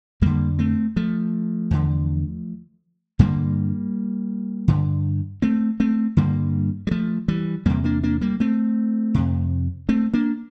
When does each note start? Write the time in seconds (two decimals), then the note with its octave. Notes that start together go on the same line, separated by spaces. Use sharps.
0.21 F2 D3 G3 A#3
0.59 A3 C4
0.96 F3 A3
1.71 E2 D3
3.19 G2 D3 G3 A#3
4.68 G2 D3
5.42 A3 C4
5.80 A3 C4
6.17 G2 D3 G3 A#3
6.87 G3
6.91 F3 A3
7.28 E3 G3
7.66 E2 C3 G3 A#3
7.84 A#3 D4
8.03 A#3 D4
8.21 G3 A#3
8.40 A3 C4
9.14 F2 C3
9.89 A3 C4
10.14 A#3 D4